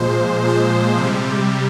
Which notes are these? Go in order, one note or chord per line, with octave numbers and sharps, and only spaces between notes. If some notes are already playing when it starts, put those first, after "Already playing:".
Already playing: A#2 F3 G#3 C5
A#2 F3 G#3
C3
G3